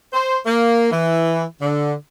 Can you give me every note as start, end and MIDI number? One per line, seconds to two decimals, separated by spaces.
0.13 0.36 72
0.46 0.89 58
0.91 1.44 52
1.61 1.92 50